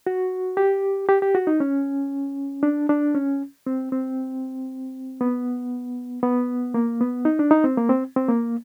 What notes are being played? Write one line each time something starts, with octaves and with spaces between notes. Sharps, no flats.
F#4
G4
G4
G4
F#4
D#4
C#4
D4
D4
C#4
C4
C4
B3
B3
A#3
B3
D#4
D4
D#4
C4
A#3
C4
C4
A#3